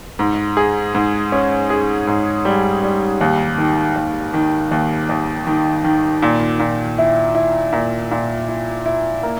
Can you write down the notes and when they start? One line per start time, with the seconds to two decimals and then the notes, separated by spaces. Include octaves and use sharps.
0.19 G#2
0.57 G#4
0.95 G#2
1.32 C#4
1.70 G#4
2.07 G#2
2.45 G3
2.83 G3
3.21 D#2
3.58 D#3
3.96 D#2
4.34 D#3
4.71 D#2
5.09 D#2
5.47 D#3
5.84 D#3
6.22 A#2
6.59 A#2
6.98 E4
7.35 E4
7.73 A#2
8.11 A#2
8.48 E4
8.86 E4
9.23 A#3